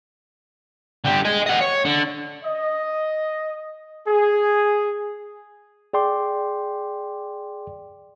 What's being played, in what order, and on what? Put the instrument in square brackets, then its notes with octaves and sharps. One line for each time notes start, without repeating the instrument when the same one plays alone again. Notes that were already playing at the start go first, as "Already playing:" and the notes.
[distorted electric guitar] D3 G4
D#5 G#5
D#5 F#5
C#5
D3
[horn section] D#5
G#4
[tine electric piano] G#4 D5 G5 C6 D6